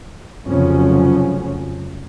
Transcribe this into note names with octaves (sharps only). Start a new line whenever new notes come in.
F1 F2 C#3 F3 F#3 C#4